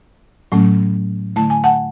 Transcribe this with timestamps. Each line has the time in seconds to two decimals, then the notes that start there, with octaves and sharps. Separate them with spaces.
0.52 A2 F#3 A3 C#4
1.36 D3 A3 E4 A5
1.50 G#5
1.64 F#5 A5